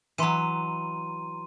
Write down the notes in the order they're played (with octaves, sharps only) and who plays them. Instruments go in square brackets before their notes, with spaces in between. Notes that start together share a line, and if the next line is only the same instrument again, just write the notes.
[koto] E3 F#3 [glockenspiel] A#5 C6 D#7